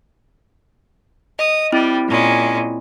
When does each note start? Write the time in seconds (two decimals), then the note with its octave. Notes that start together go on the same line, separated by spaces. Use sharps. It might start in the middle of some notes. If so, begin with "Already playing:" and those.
1.39 D#5 D#6
1.72 G3 C4 E4
2.07 A#2 G#3 C#4